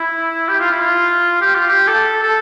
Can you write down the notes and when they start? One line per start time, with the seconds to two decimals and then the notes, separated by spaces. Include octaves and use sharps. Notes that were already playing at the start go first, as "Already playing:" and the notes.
Already playing: E4
0.48 G4
0.59 F4
0.70 E4
0.80 F4
1.41 G4
1.55 F4
1.69 G4
1.87 A4
2.22 A4